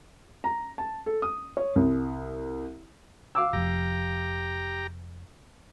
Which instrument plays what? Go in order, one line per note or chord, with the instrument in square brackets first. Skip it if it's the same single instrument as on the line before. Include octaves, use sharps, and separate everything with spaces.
[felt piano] A#5
A5
A4
D#6
C#5
C2
[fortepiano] F5 D6 E6
[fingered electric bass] F1 F2 [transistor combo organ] G4 A#5